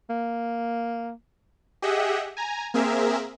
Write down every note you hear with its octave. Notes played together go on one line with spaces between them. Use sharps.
A#3
G4 G#4 D#5 E5 F#5
G#5 A#5
A#3 C4 G#4 A#4 E5